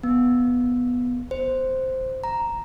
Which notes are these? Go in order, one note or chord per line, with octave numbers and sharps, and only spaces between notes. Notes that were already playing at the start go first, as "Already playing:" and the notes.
B3
C5
A#5